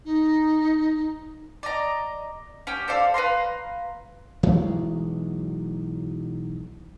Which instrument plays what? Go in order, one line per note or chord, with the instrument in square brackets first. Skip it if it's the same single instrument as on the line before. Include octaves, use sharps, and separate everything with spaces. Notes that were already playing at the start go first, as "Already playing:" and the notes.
[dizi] D#4
[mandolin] D5 D#5 A#5
C#4 G4 G5
A4 C5 D5 F5
B4 F5 A#5 C6
[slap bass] B1 E3 F#3 G#3